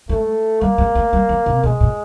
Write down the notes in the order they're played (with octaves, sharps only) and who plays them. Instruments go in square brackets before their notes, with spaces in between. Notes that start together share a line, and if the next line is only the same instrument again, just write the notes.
[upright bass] G#3 [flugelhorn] A3
[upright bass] G3 [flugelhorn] A#3
[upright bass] G#3
A3
G3
F#3
C3
[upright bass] B2 [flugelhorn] G#3
[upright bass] A#2